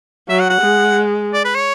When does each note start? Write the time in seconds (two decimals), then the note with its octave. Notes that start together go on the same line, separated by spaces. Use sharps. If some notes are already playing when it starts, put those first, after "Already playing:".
0.29 F#3 E5
0.39 F#5
0.50 F#5
0.61 G#3
1.34 D5
1.45 B4
1.55 C#5